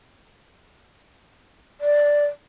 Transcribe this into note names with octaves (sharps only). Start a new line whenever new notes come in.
D5